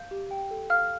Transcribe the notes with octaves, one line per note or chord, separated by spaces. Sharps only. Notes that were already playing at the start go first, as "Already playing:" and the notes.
Already playing: F5 G6
G4
G5
A4
F5 F6